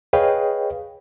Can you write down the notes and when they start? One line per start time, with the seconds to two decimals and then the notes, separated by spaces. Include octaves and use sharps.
0.13 G#4 B4 C#5 D#5 F5 G5